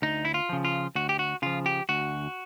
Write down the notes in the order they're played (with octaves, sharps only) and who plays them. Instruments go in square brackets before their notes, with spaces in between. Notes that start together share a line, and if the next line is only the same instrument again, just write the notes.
[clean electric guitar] D2 D#4
E4
F4
C#3 F3
F4
D2 F#4
G4
F#4
C#3 F3 F4
G4
D2 F#4